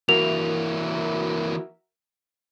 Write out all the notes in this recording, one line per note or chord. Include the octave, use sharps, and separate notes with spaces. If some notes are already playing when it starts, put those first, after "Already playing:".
E3 A#3 F#4 A#4 E5 F7